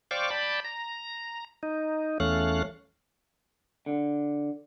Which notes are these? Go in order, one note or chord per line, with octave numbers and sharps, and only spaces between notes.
C5 D5 F5 G5 C#6 D6
D5 G5 A5 B5
A#5
D#4
E2 A3 C#4 F5 F#6
D3